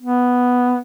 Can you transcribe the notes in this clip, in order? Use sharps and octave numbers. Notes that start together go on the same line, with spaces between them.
B3